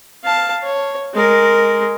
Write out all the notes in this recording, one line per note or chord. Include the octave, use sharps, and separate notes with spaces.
F5 A5
C#5
G#3 A#4